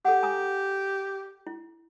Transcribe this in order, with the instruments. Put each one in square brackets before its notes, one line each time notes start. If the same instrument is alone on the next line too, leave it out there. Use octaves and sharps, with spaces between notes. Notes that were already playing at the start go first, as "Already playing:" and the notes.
[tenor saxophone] G4 [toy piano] A4 F#5
[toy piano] G#5 A#5 D#6
E4